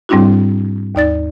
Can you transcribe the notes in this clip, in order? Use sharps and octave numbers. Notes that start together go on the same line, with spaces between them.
G#2 G3 C4 D4 E4 F#4
D#2 D#4 D5 A6